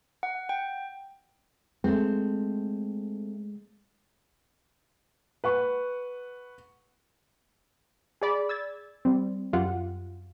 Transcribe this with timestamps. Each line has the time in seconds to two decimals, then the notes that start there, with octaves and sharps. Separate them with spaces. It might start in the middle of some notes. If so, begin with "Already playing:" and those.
0.23 F#5
0.49 G5
1.84 G#3 A3 C4
5.44 B4 F#5 C#6
8.22 G#4 D5 B5
8.49 E6 G#6 A6
9.05 G3 C4
9.53 F#2 F4 G4 F#5